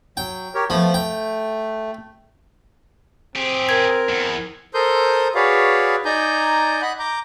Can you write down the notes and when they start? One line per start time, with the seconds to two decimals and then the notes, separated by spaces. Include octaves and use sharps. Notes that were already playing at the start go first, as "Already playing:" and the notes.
0.17 F#3 G5
0.55 G4 A#4 C#5
0.70 F3 A3 B3
0.94 A3 G5
3.36 C4 G4 G#4
3.69 A#4 G#6
4.09 E2
4.74 A4 A#4 C5 C6 D#6 G6
5.35 F#4 G#4 B4 C#5 D5 F5
6.05 D#4 D5 G#5 A#5 G6
6.82 D#5 F#5 B5 F#6
6.99 A#5 D6 G6